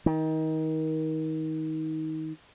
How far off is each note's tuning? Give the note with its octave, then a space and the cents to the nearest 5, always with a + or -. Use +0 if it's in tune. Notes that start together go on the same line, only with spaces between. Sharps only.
D#3 +25